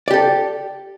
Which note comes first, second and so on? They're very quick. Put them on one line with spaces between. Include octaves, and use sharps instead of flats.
D5 G4 A4